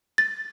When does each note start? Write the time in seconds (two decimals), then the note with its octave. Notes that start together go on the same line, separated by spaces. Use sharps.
0.18 A6